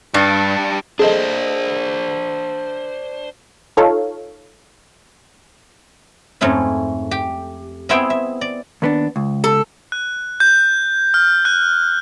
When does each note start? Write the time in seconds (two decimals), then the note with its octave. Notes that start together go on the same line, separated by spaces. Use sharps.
0.14 G2 G3 D4 A5 A6 C#7
0.99 D4 G#4 A4 C5 D#5
3.77 D#4 F4 A4 C#5 F5
6.41 F2 G#2 A3 C#4 E4
7.11 G4
7.89 B3 C4 E4 G#4 E5 G5
8.10 E5
8.41 D5
8.82 D#2 B3 D4
9.16 C#2
9.44 A4
9.92 F#6
10.40 G6
11.14 F6
11.45 F#6